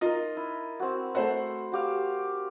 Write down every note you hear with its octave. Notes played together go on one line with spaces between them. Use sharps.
D#4 F4 A#4 D#5
E4
C4 F#4
A3 C5 F#5
F#4 G4 F5